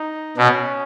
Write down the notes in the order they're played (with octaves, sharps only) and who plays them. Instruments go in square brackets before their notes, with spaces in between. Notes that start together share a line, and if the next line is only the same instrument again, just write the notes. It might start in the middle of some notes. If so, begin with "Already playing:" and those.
Already playing: [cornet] D#4
[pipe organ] B2 [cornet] C#4